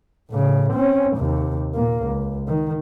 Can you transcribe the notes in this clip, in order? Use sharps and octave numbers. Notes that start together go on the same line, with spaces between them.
A2 C#3
C4 C#4
D#2 C3
A#2 A#3
C#2
D#3